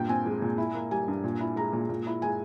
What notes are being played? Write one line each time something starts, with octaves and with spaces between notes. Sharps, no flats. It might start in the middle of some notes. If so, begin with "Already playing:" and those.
Already playing: G2 A#2 G5
C4 G#5
G#3
A#2
E4
A#3
G3 G#5
G2
A#2
E4
G#3 A#5
A#2
A#2
E4
G#3 G#5